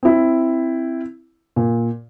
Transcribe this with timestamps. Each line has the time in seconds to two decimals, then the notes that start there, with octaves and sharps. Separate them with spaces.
0.03 C4 E4
1.56 A#2